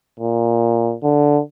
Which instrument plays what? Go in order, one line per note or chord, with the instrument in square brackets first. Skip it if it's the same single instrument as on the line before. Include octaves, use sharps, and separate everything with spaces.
[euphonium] A#2
D3